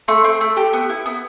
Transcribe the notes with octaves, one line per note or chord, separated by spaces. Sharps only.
A3 C6
C4
A3
G4
B3
E4
B3